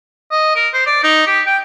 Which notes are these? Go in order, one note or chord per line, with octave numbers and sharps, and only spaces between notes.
D#5
A#4
C5
D5
D#4
G4
G5